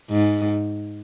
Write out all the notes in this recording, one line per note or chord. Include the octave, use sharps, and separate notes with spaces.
G#2